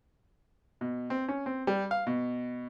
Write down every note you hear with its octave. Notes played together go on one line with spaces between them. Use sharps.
B2
C4
C#4
C4
G3
F5
B2